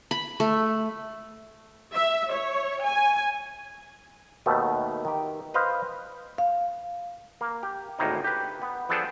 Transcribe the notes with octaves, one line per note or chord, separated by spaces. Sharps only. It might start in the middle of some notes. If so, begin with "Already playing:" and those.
B5
A3
E5
C#5
G#5
D#2 B2 D#3 A3 E5
D#3 G4
B4 C5 D#5 F5
F5
A#3
G4
G#1 D2 A2 D#3 A#3 D#4
G4 B4
B3
F3 B3 D4 G#4 A4 G5